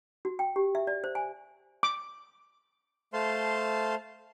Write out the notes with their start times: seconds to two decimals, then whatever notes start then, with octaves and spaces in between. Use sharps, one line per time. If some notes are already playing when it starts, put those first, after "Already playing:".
0.25 F#4
0.39 G5
0.56 G4
0.75 E5
0.87 D5
1.04 C5
1.15 G#5
1.83 D6
3.13 A3 C5 F5 A5 C6